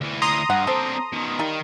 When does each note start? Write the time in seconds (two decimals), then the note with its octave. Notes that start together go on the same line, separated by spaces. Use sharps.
0.01 D2 E3
0.22 A#5 C6 D#6
0.50 G2 F#5
0.67 C4 D4 A4 C5
1.13 B2 D#3
1.39 D#3 G3 A#3 D#4